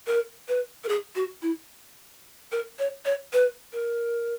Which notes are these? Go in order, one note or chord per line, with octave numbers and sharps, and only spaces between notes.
A#4
B4
A#4
G#4
F#4
E4
A#4
C#5
C#5
B4
A#4